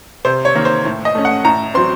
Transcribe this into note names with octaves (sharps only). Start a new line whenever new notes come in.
C3 C5
C#5
D#3 A#3
C5
A2
D#5
A3 C#4
F#5
A2 A#5
F#3 C4 C6